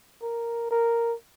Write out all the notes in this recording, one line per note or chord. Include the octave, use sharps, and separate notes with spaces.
A#4
A#4